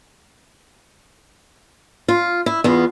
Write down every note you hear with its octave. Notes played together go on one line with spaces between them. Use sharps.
F4
E4
E2 B3 F4